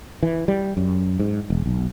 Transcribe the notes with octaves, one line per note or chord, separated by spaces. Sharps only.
E3
G3
F#2
G#2
E1
B1